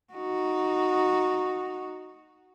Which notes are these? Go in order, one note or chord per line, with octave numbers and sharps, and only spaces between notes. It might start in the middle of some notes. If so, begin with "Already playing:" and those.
D#4 F#4